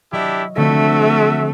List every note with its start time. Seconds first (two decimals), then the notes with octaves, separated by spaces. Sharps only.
0.13 F#3 D4 E4 G4 D#5 F5
0.57 D3 F3 A3 C4 F#4 E5